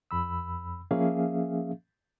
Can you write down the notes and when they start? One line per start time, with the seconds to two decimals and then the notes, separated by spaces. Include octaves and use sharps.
0.11 F2 B5 E6
0.91 F3 A#3 C#4 G#4 E5 F5